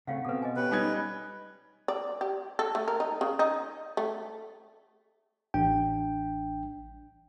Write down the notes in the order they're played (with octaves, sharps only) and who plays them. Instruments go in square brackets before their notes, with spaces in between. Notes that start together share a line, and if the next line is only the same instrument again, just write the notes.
[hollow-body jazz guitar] C#3 A3 C4 [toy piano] F5 F#5
[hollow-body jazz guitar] B2 C4 [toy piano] A4 B4
[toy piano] D#5 G#5
[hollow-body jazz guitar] B3 C#4 G4 [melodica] B4
[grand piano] G3 D#4 G#6 [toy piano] G#5
[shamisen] D5
G4
A4
A3
A#4
D#4
C#3
D#4
A3
[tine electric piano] A1 D4 G5